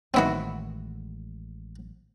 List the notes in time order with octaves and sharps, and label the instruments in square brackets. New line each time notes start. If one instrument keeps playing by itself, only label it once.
[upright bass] A1 G#3 [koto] D#3 E4 F#4 [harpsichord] B3 C4